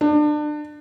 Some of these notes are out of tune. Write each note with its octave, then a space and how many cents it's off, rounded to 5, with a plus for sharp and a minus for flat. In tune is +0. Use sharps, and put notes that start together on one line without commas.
D4 +30